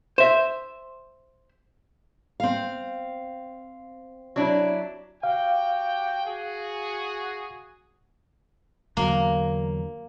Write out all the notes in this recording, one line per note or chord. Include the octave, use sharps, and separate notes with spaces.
C5 E5
C4 F5
F#3 D4 E4
F#4 G4 F5 G5
F#4 G#4
E2 D3 F#3 A#3